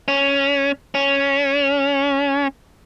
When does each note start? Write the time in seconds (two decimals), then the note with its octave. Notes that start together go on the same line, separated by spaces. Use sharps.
0.08 C#4
0.95 C#4